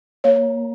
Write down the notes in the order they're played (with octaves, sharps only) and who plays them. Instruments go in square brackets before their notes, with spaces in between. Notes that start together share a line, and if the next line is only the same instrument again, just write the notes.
[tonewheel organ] A#3 [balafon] C#5